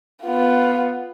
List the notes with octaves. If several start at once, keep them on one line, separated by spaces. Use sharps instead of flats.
B3 F4